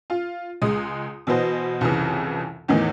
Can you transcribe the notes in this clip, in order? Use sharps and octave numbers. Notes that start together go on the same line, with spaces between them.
F4
C#2 G#3 D#6
B2 E3 B3 C5 D#5
C2 F2 C#3 E3
E2 A2 D#3 E3